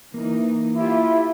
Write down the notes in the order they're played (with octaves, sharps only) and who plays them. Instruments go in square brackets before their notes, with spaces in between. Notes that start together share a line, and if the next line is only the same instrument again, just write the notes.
[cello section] E3 D#4 [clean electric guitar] A#3
[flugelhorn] E4 [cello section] F4 G4 E5